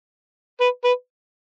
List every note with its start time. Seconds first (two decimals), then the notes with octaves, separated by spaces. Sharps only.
0.61 B4
0.84 B4